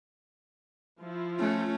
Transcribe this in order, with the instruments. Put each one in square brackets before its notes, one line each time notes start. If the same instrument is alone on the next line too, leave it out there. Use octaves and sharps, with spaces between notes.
[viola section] F3 E4 F4
[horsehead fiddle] A3 C#4